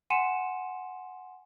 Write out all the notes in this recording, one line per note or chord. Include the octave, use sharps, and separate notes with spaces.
F#5 G#5 C6 C#7 D#7 E7